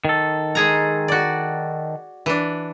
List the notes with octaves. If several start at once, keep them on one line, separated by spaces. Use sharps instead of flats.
D#3 A4
G#3 G#4 A#5
F#4 D5
E3 D4